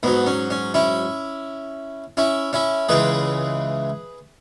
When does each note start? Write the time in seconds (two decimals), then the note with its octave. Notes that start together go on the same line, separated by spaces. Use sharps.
0.03 G#2 F#3 B3
0.26 C#4
0.50 C#4
0.74 C#4 E4
2.17 C#4 E4
2.53 C#4 E4
2.89 C#2 C#3 E3 G#3 G#4 B4